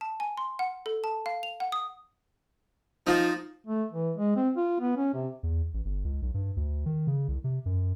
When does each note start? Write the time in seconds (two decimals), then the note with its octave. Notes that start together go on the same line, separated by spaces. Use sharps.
0.01 A5
0.20 G#5
0.37 C6
0.59 F#5
0.86 A4
1.04 A5
1.26 F5
1.43 F7
1.60 F#5
1.72 D#6
3.07 F3 D#4 F4
3.67 A3
3.92 E3
4.17 G#3
4.36 C4
4.57 F4
4.80 B3
4.97 C#4
5.14 C3
5.43 E2
5.74 A1
5.85 G1
6.04 C#2
6.22 B1
6.34 G2
6.56 D2
6.86 D#3
7.07 C#3
7.28 C2
7.44 C3
7.66 F#2